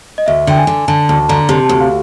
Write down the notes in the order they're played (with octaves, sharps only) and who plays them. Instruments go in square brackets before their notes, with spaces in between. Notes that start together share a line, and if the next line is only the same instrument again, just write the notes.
[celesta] D#5
[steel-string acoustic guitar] D2 [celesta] E5
[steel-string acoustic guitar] D3 [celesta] G5
[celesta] G#5
[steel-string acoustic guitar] D3
[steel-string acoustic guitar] D3 [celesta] A5
[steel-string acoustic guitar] D2 [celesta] A5
[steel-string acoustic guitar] D3 [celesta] A#5
[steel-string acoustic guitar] C3 [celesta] A5
[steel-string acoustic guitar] D2 [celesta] A5
[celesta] F5